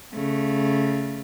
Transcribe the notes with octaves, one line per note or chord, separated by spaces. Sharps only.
C#3 A3